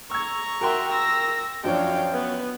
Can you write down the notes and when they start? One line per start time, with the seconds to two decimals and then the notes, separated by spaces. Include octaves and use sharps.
0.11 A#5 C#6 E6 G#6
0.61 F#4 A#4 E5 G5 C6
0.92 E6 A#6
1.64 F#2 F3 D4 C#5 F5 G5
2.13 B3 B4